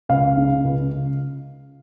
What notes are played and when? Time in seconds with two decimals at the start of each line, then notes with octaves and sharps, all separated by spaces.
0.09 C#2 F5
0.37 C#3
0.64 C#2